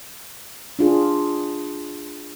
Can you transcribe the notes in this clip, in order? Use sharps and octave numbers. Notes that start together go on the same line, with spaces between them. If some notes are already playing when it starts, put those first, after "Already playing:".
D4 F4 G#4